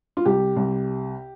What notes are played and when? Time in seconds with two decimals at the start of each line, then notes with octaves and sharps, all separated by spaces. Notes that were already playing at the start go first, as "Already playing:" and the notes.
0.17 F4
0.25 C2 G4
0.56 C2